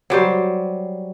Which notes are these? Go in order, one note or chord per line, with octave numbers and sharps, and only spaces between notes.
F#3 G3 C5